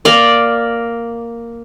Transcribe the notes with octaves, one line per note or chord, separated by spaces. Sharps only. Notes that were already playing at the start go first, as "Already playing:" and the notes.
A#3 D5